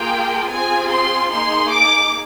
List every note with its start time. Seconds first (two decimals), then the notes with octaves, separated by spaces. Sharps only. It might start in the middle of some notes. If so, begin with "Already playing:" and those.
Already playing: A#3 F4 G#4 G5
0.49 C4 F4 G#4 G#5
0.90 C6
1.31 A#3 D#4 G#4 C6
1.72 D6